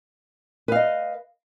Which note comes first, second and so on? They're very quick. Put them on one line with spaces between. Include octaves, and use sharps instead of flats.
B4 F5 D#5